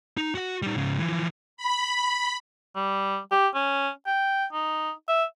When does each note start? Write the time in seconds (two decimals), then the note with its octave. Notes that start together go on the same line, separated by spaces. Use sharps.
0.17 D#4
0.35 F#4 F#5
0.62 G3 D#4
0.75 G#2 C#3
0.99 E3 F3
1.57 B5
2.75 G3
3.31 G4
3.55 C#4
4.06 G5
4.53 D#4
5.08 E5